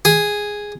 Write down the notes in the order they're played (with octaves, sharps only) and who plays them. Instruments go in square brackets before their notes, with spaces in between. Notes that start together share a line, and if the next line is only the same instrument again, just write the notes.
[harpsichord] G#4